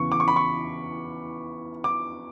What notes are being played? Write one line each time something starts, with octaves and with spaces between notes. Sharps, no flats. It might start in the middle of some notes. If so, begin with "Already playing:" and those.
Already playing: E2 C#3 E3 C#6
D6
C#6
B5
C#6
D6